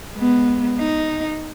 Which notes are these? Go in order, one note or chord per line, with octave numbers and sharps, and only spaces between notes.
G#3 B3
D#4